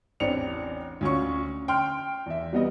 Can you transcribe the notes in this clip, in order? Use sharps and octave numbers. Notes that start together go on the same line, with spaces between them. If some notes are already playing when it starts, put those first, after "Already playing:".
A1 E2 C4 D4 C#7 F7
D2 C#4 F4 C#6
G5 C6 F6
E2 E5
G3 B3 D#5